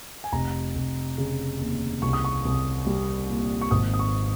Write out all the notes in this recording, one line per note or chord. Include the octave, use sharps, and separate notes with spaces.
G#5
F1 A#5
F1
C#3
D#2
C2 C#6
D#6
C#6
C2
G3
A#2
C#6
G#1 D#6
D#6
C#6